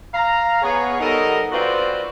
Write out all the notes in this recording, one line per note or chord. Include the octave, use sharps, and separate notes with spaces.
F5 A#5
B3 G#4 C#5
G3 B3 D#4 A4 A#4 D#5
C4 F4 F#4 B4 C5 D5